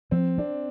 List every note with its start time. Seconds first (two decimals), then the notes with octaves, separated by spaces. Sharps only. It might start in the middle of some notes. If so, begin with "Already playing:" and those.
0.11 F3 C4
0.38 C4 D4